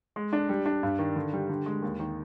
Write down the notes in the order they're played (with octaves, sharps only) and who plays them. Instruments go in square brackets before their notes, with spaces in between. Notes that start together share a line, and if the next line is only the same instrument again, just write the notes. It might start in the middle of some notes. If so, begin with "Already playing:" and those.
[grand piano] G#3
D4
G3
D4
G2
D#3
D3
G3
D3
G#3
D#2
D#3